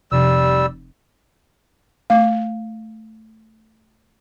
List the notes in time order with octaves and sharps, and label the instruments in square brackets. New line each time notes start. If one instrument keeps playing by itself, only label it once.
[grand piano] F1 [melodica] G3 E6
[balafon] A3 F5